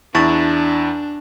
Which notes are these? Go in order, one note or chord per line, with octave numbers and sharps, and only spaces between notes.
E2 D4 E4 A5 C#6 A6